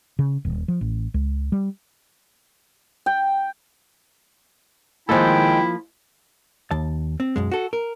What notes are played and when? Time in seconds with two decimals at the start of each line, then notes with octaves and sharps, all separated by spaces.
0.19 C#3
0.45 D#1
0.68 F3
0.81 A1
1.14 C#2
1.52 G3
3.06 G5
5.09 D#3 F3 G#3 A#3 E4 A4 G5
6.71 D#2 A5
7.20 C4
7.36 B1 F#2 G#3
7.52 F#4 A4
7.73 A#4